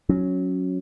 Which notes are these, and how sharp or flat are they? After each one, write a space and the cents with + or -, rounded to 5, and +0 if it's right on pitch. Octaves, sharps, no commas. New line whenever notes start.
F#3 -10 C#4 +0